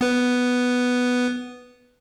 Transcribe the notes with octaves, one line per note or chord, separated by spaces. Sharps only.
B3 B4